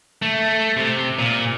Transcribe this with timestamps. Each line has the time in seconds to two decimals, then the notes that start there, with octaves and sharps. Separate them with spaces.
0.22 A3
0.77 C3
1.19 A#2